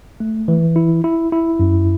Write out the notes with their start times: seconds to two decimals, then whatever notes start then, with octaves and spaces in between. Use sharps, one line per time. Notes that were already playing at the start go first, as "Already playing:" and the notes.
0.20 A3
0.48 E3
0.76 E4
1.04 E4
1.32 E4
1.59 F#2